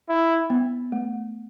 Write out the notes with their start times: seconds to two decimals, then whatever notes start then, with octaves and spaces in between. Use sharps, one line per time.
0.09 E4
0.50 B3
0.92 A3